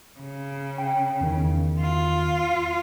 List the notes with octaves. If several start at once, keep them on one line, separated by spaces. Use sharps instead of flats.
C#3
G5
E2 D#3
F4